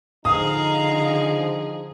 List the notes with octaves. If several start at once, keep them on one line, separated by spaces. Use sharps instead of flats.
D3 F3 D#4 G#4 F5 A#5 D#6